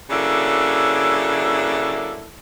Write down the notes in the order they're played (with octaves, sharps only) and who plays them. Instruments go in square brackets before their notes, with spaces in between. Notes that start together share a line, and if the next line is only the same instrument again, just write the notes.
[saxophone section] C#3 F#3 A#3 D4 E4 A4